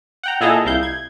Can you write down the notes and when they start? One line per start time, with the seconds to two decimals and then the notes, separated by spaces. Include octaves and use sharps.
0.23 F#5 G5 A#5
0.40 A#2 E4 G#4 A4 D#5 A#5
0.65 C2 E4 F5 G6
0.83 G#6